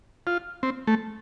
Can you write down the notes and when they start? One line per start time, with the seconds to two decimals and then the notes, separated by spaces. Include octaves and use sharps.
0.27 F4
0.63 C4
0.87 A3